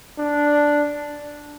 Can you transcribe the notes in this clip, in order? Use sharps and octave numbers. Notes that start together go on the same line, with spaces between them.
D4